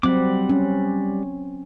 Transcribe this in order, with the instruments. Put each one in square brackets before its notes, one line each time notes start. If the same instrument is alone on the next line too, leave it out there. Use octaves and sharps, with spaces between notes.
[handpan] F#3 C4 [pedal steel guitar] G3 F#5 D6
[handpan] C#4